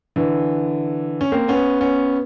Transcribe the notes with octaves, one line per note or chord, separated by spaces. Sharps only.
D3 E3
C#4
A#3 C4
B3 C#4
B3 C#4